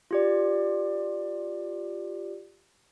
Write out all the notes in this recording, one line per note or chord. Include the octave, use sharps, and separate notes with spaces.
F4 G4 D5